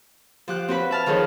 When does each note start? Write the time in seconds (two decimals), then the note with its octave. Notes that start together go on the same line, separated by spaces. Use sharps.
0.48 F3 G4 F#6
0.68 C4 F#4 B4 B5
0.91 E5 A5 F6
1.06 D#3 F3 G#4 A4 C#5